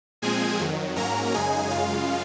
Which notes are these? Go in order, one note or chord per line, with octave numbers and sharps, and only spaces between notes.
A#2 F3 G#3 C4 G#4 G#5
F2 D#3 F#3
G#2 F#3 A#3 C#4 A#4 A#5
F#2 C#3 G#3 D#4 G#4 G#5
F#2 C#3 G#3 F4 F5